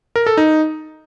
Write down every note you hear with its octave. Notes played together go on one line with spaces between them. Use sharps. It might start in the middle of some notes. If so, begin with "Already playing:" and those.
A#4
A4
D#4